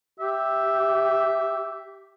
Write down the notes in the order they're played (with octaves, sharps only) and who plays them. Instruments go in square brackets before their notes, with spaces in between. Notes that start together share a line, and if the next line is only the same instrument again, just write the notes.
[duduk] G4 [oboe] E5